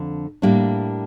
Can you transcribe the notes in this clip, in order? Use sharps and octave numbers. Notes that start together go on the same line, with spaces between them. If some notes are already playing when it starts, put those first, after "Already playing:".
Already playing: F2 D3
A2 G3 A#3 D4